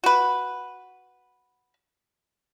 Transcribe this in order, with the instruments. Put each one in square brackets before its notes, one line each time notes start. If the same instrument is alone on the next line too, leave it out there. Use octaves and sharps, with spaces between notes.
[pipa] F#4 B4